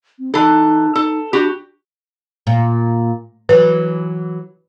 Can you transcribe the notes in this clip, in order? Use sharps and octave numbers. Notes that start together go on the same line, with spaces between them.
C4
E3 D#4 A4
D#4 A4
D4 F#4 G4
A#2
E3 F#3 B4